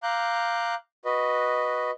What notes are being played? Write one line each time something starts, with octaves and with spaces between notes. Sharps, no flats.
F5 A#5 D6 F#6 G6
F#4 B4 D#5